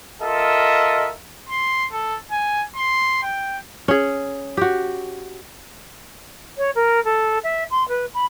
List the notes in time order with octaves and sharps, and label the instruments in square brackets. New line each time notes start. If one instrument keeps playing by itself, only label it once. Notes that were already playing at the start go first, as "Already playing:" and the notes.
[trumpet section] F4 A4 A#4 D#5 E5
[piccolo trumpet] C6
A4
G#5
C6
G5
[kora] C#4 G#4
F#4 G4
[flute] C#5
A#4
A4
E5
C6
B4
B5